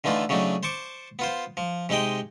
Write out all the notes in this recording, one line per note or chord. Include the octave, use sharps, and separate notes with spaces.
D3 E3 A3 D#4 F4
C#3 F#3 A3 D4 D#4
C5 A5 C#6 D6
B3 F4 C5
F3
C3 G#3 D#4 D#5 G5